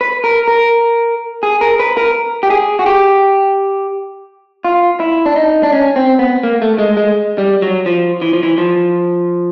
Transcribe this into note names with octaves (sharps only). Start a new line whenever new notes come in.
B4
A#4
A#4
G#4
A#4
B4
A#4
G4
G#4
F#4
G4
F4
E4
D4
D#4
D4
C#4
C4
B3
A#3
A3
G#3
G#3
G3
F#3
F3
E3
F3
E3
F3